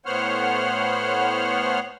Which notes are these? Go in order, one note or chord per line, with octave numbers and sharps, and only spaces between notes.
A2 B3 C5 C#5 F#5 F6